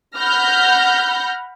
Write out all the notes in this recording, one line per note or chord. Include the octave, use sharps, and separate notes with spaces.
F#5 B5 F6 G6 A#6